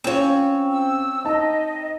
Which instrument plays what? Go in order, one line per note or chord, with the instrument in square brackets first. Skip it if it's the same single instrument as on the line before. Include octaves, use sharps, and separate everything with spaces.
[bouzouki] C4 C#5 [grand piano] C#4 F4
[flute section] E6
[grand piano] D#4 A5 [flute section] D#5